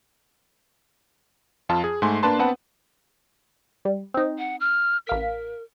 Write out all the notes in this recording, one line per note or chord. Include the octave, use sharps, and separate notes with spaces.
F2 F4 A5
G#4
G#2 A3 G#5 C6
A#3 D4 B4 A5 C6
B3 C4 B4 F#5 A5
G3
C4 D#4
F#5
F6
A1 A#4 F5 B6